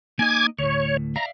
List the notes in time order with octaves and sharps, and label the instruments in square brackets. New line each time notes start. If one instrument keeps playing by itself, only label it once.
[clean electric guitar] A#3 D#4 D#5 [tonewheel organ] G#5 D6 G#6
[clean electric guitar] D2 A2 [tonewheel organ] C#5
[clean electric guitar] D5 E5 F5 [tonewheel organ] A#5